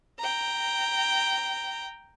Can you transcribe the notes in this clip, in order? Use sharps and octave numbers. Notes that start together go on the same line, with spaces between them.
G5 A#5